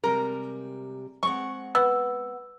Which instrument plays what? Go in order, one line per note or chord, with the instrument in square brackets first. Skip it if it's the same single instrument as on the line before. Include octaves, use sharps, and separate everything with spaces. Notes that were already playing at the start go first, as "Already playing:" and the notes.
[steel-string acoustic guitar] C3 G3 G#3 [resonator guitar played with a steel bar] A#4
[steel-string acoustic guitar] G#3 C4 F#5 [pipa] C#6
[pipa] B3 [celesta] E6